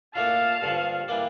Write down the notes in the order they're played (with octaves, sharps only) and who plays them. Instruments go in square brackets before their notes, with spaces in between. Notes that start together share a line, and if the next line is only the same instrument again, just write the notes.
[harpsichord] A#2 A3 D4 F4 [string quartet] F5 A5
[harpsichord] G2 D3 F3
E3 G3 A#3 D4